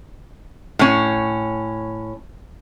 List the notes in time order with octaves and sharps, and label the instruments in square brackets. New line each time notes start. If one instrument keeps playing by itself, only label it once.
[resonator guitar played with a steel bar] A2 C#4